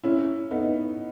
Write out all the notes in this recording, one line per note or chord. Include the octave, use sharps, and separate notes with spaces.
C#4 E4
B3 D#4